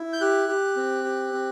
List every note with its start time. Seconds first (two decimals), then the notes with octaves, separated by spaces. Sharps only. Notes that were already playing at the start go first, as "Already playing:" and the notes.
Already playing: E4
0.13 G6
0.21 G4 F#6
0.48 G4
0.76 C4
1.04 G4
1.33 C4